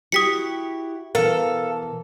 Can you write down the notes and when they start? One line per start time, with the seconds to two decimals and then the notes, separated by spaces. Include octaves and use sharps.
0.12 E4 F#4 G4 D#6 B6 C#7
1.15 B2 E3 A4 A#4 F5